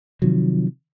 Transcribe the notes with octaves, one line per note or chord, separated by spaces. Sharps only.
C3 D#3 F3 F#3